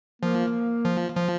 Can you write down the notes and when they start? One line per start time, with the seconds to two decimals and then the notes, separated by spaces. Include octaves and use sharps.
0.22 F3 A#3
0.85 F3
1.16 F3